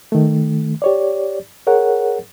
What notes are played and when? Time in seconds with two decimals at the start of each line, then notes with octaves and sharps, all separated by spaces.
0.12 D#3 A3
0.82 G4 C#5 D5
1.67 G#4 A#4 C#5 F#5